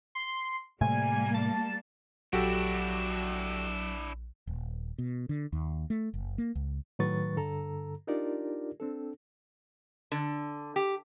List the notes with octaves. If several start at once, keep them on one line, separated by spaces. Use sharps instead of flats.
C6
A2 C3 G3 A3 A#3 G#5
A5
A#1 F#3 D4 E4 F#4 G4 A4
D#1
B2
D3
D#2
A3
F#1
A#3
C#2
A2 D#3 F#3 B4 C#6 A6
G2 D3 A4 A#5
D4 D#4 F4 G4 A#4 D5
C4 D4 A4
D3
G4